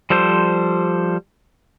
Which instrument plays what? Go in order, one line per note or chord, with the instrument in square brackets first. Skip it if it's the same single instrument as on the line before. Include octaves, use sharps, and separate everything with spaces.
[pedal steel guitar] F3 G3 A4 C5